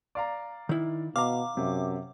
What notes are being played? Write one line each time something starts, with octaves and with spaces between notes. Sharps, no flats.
D5 F5 A#5
D#3 E4
B2 F5 A#5 D6
F#2 C3